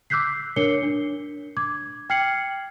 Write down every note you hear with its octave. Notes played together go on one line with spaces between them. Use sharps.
D6 E6 F#6 G6 B6 C7
D4 A#4 C#5 C7 C#7 G7
D4
D6 G#6
G5 F6 G#6 C7 C#7 F#7